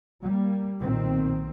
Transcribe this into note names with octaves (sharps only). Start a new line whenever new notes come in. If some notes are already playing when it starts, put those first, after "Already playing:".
G3 A#3
B1 A#2 D#3 C4